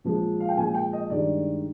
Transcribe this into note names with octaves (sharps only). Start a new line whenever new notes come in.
A#2 F3 G#3
F5
G5
A#2 F3 G#3 G#5
G5
D#5
G2 D#3 G#3 D5